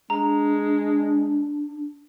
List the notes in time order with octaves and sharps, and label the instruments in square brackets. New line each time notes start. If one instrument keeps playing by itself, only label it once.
[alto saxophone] G#3 [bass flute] D4 [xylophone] A#5